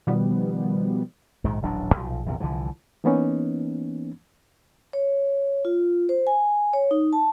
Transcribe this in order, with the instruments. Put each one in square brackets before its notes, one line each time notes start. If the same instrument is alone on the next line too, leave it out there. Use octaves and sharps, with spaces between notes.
[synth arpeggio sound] B2 D#3 F3 G3 B3
[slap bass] A#1 G#2 D#3
D#1 A1 F#3 D4
B1 A#2 F3
A#1 E2 C3
C2 D3 E3 F3
[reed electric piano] E3 A#3 B3 C#4 D#4
[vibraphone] C#5
F4
C5
G#5
C#5
D#4
A5